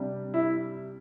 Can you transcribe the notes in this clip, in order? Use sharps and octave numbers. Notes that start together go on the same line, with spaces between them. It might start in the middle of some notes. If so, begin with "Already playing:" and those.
Already playing: C3 G3 D4
E4